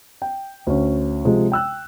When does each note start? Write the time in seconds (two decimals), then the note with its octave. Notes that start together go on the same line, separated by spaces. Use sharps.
0.22 G5
0.67 D2 C#4
1.25 C3 F3 G#3
1.52 G5 E6 F#6